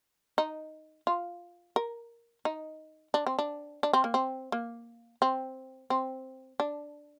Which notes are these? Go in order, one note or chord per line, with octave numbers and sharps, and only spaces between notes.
D#4
F4
A#4
D#4
D4
C4
D4
D4
C4
A#3
C4
A#3
C4
C4
D4